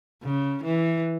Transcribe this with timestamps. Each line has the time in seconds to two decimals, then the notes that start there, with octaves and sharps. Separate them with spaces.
0.23 C#3
0.64 E3